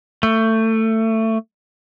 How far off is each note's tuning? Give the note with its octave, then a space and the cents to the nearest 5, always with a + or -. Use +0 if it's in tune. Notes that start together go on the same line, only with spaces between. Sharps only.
A3 +20